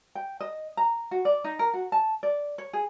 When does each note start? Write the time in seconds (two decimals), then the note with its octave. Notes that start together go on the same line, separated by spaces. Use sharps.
0.15 G5
0.41 D#5
0.77 A#5
1.11 F#4
1.25 D5
1.44 D#4
1.59 A#4
1.74 F#4
1.92 A5
2.23 D5
2.58 C#5
2.73 G#4